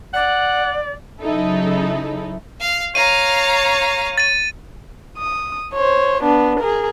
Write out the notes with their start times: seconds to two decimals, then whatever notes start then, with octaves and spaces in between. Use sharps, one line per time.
0.14 D5 F#5
1.21 C#3 F#3 D#4 E4 A4
2.60 F5
2.95 C#5 F5 A#5 D#7
4.18 A6 D#7
5.18 D#6
5.74 C5 C#5
6.23 B3 D4
6.60 G#4 A#4